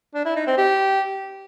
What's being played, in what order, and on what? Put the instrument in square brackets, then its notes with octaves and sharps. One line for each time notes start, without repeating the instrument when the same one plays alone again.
[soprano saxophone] D4
E4
D#4
C4
G4